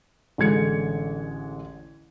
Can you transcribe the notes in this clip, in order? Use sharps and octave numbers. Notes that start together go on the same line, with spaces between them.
A1 D3 G#3 G#6 C#7